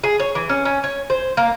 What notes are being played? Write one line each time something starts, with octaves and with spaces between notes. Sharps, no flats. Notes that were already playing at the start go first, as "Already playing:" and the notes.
G#4
C#5
E3
C#4
C#4
C#5
C5
A#3